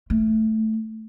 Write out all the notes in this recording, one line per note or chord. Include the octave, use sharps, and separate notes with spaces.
A3